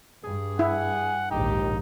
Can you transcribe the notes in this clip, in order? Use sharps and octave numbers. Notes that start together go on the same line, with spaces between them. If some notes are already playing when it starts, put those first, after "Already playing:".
G2 G#4
E4 F#5
A#1 D#2 G#2 D#4 G4